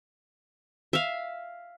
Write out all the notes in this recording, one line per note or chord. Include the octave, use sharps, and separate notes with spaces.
E5 F5